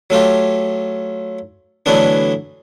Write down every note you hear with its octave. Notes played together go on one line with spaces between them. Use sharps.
F#3 A3 F4 G4
D3 E3 F#3 A3 B3 D4